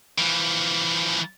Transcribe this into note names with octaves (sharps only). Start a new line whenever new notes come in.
E3 F3